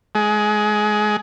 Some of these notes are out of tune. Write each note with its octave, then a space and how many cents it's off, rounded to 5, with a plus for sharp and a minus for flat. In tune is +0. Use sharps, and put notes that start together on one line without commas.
G#3 +20